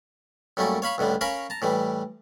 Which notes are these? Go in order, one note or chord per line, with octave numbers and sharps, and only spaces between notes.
F#2 G3 A3 A#3 C#4
C#5 F5 B5 C#6
C#2 A2 D3 G3
C#4 A#4 F5 B5 C#6
A5 A#5
A2 E3 G3